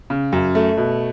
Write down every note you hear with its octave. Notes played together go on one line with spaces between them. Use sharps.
C#3
F#2
A3
B2